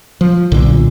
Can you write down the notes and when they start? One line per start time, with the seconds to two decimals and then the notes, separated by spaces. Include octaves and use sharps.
0.21 F3
0.52 B1 A#2 D3